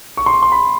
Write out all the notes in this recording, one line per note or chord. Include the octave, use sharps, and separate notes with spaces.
C#6
C6
C#6
C6
B5